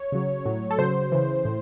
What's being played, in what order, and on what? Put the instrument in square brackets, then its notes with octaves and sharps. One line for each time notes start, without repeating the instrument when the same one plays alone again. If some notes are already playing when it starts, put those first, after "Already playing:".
Already playing: [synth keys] C#5
C#3 F#3
A2 F#3
A4
C#3 F#3 C5
C#3 E3
A2